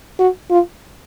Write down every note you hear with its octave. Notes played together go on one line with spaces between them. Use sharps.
F#4
F4